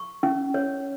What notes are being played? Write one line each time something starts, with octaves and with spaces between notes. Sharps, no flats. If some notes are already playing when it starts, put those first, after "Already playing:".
Already playing: C#6
C#4
C#5